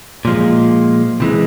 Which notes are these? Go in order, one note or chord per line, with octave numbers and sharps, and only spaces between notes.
A#2 F3 G#3
C3 E3 G#3